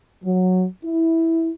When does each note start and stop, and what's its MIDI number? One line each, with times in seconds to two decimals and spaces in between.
0.24 0.65 54
0.85 1.50 64